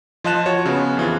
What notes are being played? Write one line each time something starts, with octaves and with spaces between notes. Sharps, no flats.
F3 F4 D#5 A5 F#6 E7
F#4 C#5
C#3 B3
F2 E3 F4